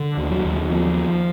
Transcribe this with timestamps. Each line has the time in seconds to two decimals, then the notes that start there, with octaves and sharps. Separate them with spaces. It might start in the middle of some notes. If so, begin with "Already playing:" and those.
Already playing: D3
0.17 D#2
0.31 F#3
0.44 D#2
0.69 F3